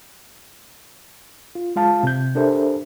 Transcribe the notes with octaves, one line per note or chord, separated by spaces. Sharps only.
F4
G#3 F4 F5 A5
C3 G6
D4 G4 A4 A#4 C5 E5